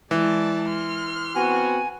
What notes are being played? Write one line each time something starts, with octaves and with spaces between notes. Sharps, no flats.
E3 G#3 D5 A5
C6 F6
B3 C4 F#4 G#5